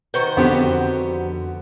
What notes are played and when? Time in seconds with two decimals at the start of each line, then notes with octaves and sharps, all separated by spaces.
0.14 D#3 F#4 B4 C5
0.37 F2 D3 B3 C4 G4